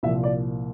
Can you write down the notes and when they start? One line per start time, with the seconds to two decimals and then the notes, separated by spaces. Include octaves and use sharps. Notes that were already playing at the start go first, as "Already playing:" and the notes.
0.03 C2 A#2 F3 E5
0.24 D5